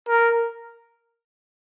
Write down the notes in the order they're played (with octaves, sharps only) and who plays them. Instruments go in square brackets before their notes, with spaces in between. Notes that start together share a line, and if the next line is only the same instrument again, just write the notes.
[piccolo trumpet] A#4